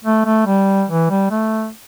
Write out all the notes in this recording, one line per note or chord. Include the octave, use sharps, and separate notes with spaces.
A3
A3
G3
E3
G3
A3